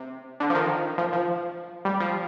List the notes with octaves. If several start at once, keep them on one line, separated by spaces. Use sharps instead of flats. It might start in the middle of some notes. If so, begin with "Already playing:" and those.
Already playing: C3
D3
F3
D#3
F3
F3
G3
F3